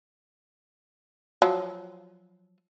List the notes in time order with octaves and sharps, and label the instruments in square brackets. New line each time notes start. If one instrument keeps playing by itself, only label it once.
[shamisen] F3 F#3